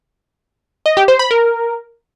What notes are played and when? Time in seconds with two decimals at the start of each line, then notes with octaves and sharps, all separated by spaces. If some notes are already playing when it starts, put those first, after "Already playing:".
0.86 D#5
0.97 G4
1.08 C5
1.19 B5
1.31 A#4